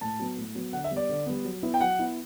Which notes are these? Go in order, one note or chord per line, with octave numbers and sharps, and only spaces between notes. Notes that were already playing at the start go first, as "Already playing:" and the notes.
A2 A5
F#3 B3
A2
F#3 B3
D3 F#5
E5
G3 B3
D5
D3
G3 B3
F#3
B3 E4
G5
F#3 F#5
B3 E4